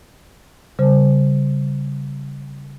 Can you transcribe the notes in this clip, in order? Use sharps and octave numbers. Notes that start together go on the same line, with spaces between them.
C#3 G3 C5